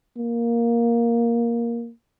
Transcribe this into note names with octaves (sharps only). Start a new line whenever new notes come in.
A#3